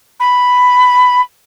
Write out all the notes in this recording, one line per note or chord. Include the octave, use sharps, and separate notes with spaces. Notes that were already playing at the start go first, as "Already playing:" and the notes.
B5